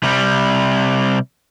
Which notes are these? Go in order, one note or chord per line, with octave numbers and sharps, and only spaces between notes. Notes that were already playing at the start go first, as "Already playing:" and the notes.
C3 G3